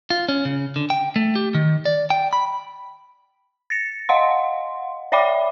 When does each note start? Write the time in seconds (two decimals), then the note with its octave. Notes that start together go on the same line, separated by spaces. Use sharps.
0.10 F4
0.29 C#4
0.45 C#3
0.76 D3
0.90 G5
1.16 A3
1.36 G4
1.55 D#3
1.85 D5
2.10 G5
2.33 B5
3.70 A6 A#6 C#7
4.09 D#5 F5 F#5 C6
5.12 C#5 D5 E5 G5 B5 D6